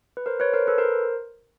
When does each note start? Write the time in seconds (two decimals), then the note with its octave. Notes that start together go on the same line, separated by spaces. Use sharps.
0.17 B4
0.26 A#4 C5
0.40 B4 C#5
0.54 A#4 C5
0.67 A4 B4
0.78 A#4 C5